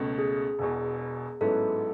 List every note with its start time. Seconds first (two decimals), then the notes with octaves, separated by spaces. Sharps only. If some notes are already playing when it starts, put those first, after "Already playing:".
Already playing: C#2 B2 A3
0.18 G#4
0.59 E1 E2 B2
1.41 A1 G#2 F#3 B3 E4 A4